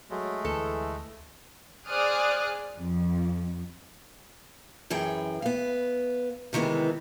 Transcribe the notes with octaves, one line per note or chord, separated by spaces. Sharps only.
F#3 G#3 A3
D2 E3 A4
G#4 C5 D5 D#6 F6 F#6
F2
F#2 E3 G#4 G5
B3 F5
C3 D#3 E3 G#3 B3